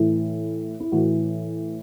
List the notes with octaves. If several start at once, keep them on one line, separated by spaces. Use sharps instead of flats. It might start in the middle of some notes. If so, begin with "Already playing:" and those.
Already playing: A2 E3
E4
A2 E3 F#4